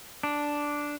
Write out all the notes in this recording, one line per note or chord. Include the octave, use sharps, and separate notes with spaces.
D4